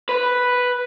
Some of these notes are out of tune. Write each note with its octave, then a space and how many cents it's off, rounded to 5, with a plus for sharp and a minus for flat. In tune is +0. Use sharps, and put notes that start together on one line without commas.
B4 +0